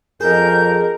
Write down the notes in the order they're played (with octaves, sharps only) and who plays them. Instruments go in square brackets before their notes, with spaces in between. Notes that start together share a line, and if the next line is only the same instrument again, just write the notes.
[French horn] F2 [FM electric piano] G#4 D#5 [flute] A#4 [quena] G6